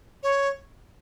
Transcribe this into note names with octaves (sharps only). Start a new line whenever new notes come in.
C#5